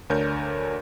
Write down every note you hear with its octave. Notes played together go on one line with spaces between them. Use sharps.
D2 D4 A#4 C#5 G6